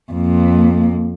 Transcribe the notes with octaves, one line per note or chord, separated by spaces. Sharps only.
F2 A#3